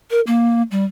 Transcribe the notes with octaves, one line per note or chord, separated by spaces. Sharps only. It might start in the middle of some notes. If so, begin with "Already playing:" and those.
A#4
A#3
G3